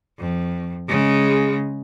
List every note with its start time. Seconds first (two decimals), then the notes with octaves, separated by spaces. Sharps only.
0.18 F2
0.88 C#3 G#3